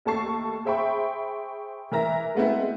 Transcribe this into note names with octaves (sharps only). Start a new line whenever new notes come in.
D#2 A3 A4 A5 C#6 C7
G#4 C5 E5 G5 B5 C#6
E3 A#4 E5 A#5 A#6
G#3 A3 B3 C4 E4